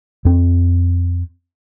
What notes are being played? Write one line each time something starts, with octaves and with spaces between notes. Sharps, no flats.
F2 C4